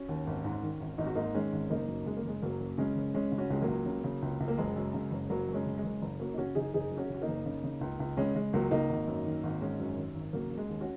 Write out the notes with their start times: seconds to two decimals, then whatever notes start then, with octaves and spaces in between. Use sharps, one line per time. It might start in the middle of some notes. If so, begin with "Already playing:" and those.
Already playing: C#4 F#4
0.08 D#2
0.27 G#1
0.44 G#2
0.63 D#3
0.80 G#1
0.98 G#1 D#4
1.06 F#4
1.15 G#2 A#3 D#4
1.34 D#3 G#3 C#4
1.52 G#1
1.70 F#1 A#3 D#4
1.88 F#2
2.06 C#3 G#3
2.17 A#3
2.24 F#1 G#3
2.42 F#1 F#3 A#3
2.60 F#2
2.78 C#3 G#3 C#4
2.96 F#1
3.14 C#3 G#3 C#4
3.32 C#3
3.38 C#4 F#4
3.50 C#2 G#3
3.62 F#3 A#3
3.68 C#2
3.86 C#3
4.04 C#3
4.22 C#2
4.40 C#2
4.48 A#3
4.58 F#1 G#3
4.76 F#2
4.94 C#3
5.11 F#1
5.30 F#1 F#3 A#3
5.48 F#2
5.54 G#3 C#4
5.66 C#3
5.78 G#3
5.84 F#1
6.02 F#1
6.20 F#2 F#3 A#3
6.33 D#4
6.38 C#3 C#4 F#4
6.55 F#1 D#4 G#4
6.74 F#1 D#4 G#4
6.91 F#2
6.97 C#4 F#4
7.09 C#3
7.14 F#4
7.21 A#3 D#4
7.28 F#1
7.46 C#3
7.64 C#3
7.81 C#2
8.00 C#2
8.17 C#3 G#3 C#4
8.35 C#3 G#3
8.53 C#2 F#3 A#3
8.71 C#2 A#3 D#4
8.89 G#1
9.07 F#2
9.26 D#3
9.43 G#1
9.61 G#1 G#3 C#4
9.79 F#2
9.97 D#3
10.15 G#1
10.33 C#3 F#3 A#3
10.51 C#3
10.57 G#3
10.69 D#2
10.81 C#4 F#4